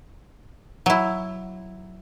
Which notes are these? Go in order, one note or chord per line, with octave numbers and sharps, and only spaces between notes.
F#3 E4